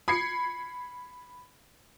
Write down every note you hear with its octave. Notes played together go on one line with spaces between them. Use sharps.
B5 G#6 C7 C#7